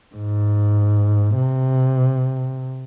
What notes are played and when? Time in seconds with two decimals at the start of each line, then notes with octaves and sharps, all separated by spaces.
0.15 G#2
1.37 C3